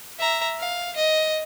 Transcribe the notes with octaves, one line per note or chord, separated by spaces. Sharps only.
E5 A#5
F5
D#5